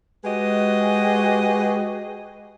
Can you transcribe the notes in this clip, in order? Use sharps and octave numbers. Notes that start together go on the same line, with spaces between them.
G#3 F#4 G4 B4 D#5